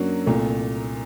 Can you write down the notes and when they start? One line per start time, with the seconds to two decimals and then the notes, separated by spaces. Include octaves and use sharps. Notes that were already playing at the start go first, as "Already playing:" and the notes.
Already playing: F#2 F#3 A#3 D4 F#4
0.26 C2 A#2 A3